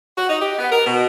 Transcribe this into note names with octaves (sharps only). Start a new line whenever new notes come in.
F#4
D#4
G4
B3
A#4
B2